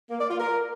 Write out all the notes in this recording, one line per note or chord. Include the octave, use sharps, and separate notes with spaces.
A#3
D5
F4
A#4